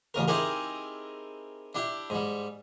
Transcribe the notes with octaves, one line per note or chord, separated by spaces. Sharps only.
A1 C#3 A#4
C4 D#4 E4 G4 G#4 A#4
D4 E4 G4
G#2 G3